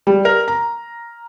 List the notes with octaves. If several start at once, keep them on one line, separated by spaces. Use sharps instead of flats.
G3
A#4
A#5